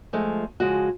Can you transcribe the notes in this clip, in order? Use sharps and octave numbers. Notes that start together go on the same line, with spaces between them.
F3 G#3 A3
C#3 F3 G#3 F4 F#4